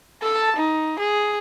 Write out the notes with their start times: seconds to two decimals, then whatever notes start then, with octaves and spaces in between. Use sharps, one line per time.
0.22 A4 A5
0.56 D#4
0.99 G#4